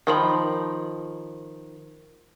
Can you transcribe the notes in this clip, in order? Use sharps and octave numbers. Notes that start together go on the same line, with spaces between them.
D#3 F3 B5